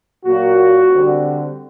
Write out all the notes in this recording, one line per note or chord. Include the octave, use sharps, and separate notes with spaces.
A#2 F#3 A#3 F#4
D3 G3 C4